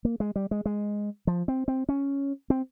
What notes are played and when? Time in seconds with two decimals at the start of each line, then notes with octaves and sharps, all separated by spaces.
0.05 A#3
0.20 G#3
0.36 G3
0.51 G#3
0.65 G#3
1.27 F3
1.48 C4
1.68 C4
1.89 C#4
2.50 C4